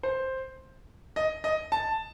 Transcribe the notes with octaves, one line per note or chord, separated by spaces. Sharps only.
C5
D#5
D#5
A5